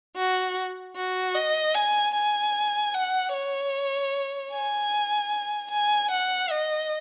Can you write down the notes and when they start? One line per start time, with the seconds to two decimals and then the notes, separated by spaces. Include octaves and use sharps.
0.16 F#4
0.96 F#4
1.35 D#5
1.75 G#5
2.14 G#5
2.94 F#5
3.33 C#5
4.52 G#5
5.71 G#5
6.11 F#5
6.50 D#5